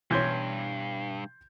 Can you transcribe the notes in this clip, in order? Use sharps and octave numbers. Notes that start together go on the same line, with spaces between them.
G2 B2 E3 C#4 C6 G6 G#6